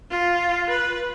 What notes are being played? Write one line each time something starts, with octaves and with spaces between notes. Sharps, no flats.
F4
B4